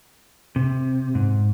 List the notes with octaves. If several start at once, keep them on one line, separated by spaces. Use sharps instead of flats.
C3
G#2